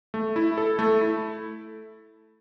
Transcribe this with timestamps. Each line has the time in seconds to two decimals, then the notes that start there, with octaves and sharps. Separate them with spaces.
0.14 A3
0.36 E4
0.58 A4
0.79 A3
1.01 E4